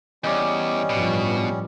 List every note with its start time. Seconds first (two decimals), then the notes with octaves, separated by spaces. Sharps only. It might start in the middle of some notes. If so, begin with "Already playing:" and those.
0.24 E2 G3 C#4 D5 D#5
0.90 A1 G2 B2 F3